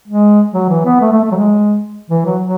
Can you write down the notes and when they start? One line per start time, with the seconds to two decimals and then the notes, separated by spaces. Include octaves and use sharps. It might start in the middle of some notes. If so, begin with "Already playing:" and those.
0.08 G#3
0.54 F#3
0.69 E3
0.85 B3
1.01 A3
1.12 A3
1.24 A3
1.32 F#3
1.36 G#3
2.10 E3
2.25 F#3
2.41 F#3